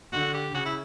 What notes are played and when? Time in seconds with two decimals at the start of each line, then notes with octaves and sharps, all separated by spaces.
0.13 D3 F#4
0.34 G4
0.54 C#3 F#4
0.66 E4